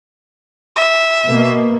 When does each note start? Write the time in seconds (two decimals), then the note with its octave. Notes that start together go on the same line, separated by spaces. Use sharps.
0.76 E5
1.26 B2 A#3